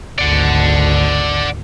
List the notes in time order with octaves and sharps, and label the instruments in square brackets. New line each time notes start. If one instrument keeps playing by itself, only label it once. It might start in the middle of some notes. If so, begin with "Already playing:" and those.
[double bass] G#1 D2 [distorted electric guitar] D5 F#5